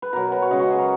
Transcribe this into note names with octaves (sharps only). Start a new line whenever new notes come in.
B4
B2 F#3 A#4
B4
C#5
C#3 G#3 D#5
F#4
G#4
A#4